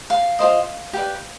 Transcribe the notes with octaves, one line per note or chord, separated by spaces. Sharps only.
F5
F4 A4 C5 D#5
G4 B4 D5